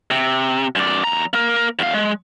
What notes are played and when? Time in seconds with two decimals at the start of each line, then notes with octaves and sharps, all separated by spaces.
0.11 C3
0.75 F#2 D5
1.04 E2 A#5
1.33 A#3 A#4
1.79 E2 F5
1.94 G#3